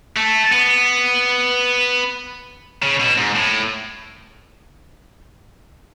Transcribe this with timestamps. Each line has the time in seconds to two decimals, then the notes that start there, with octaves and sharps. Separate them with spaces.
0.16 A3
0.52 B3
2.82 C#3
3.00 B2
3.18 G#2
3.36 A2